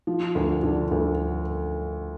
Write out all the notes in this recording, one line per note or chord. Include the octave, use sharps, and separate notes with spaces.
F3
D2
D3
D2